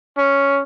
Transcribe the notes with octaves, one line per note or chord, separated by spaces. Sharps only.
C#4